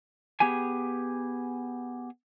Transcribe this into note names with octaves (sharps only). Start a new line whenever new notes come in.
B3 G4 G#4 G#5